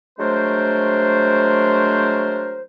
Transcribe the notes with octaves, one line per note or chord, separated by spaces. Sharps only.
F#3 G#3 A3 D4 A#4 C5